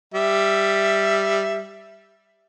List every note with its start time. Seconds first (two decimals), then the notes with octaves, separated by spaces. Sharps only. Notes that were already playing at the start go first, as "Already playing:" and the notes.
0.14 G3 E5